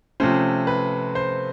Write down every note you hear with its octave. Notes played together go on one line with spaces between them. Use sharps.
C3 F3 A3 C#4 C5
B4
C5